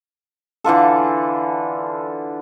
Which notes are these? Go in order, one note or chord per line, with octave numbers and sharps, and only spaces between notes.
D3 E3 F4 A4